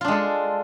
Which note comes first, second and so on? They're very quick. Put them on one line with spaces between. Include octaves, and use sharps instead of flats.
F4 D4 G#3 A4